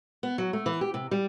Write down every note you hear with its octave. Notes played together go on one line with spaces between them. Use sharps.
B3
F#3
A3
E3
G4
C3
G3